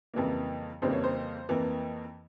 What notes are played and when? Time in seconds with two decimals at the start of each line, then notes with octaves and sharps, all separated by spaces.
0.14 F2 C#3 E3 G3 A#3
0.82 F2 C#3 E3 G3 A#3 C5
0.93 C#5
1.04 C5
1.49 F2 E3 A#3